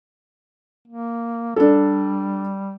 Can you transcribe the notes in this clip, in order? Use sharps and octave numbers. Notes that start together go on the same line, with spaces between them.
A#3
G3 D4 A4